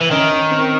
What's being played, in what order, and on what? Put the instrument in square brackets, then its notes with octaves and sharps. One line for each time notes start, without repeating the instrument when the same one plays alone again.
[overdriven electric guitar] E3
[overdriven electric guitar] D#3 [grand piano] C#4
[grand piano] C#4
C4